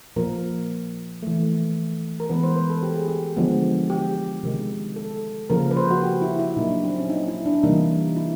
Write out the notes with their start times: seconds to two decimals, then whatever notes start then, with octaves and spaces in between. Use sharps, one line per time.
0.16 A#2 F3 A#3 A#4
1.23 E3 A3
2.20 A#4
2.29 E3 G#3 B3 B4
2.44 C5
2.56 B4
2.70 A4
2.83 G4
2.96 G#4
3.08 G4
3.36 D3 F3 G#3 B3
3.90 G4
4.43 C3 D#3 G#3
4.96 A4
5.50 C#3 F3 A#3 A#4
5.71 B4
5.77 C5
5.91 F#4
6.04 G4
6.21 E4
6.39 E4
6.56 A#2 F#3 A#3 D#4
6.70 D4
6.83 C4
6.97 C#4
7.09 D#4
7.28 E4
7.46 D4
7.63 C3 E3 G3 A#3 D#4
8.16 E4